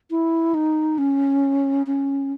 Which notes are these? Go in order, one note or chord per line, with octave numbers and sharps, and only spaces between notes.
E4
D#4
C#4
C#4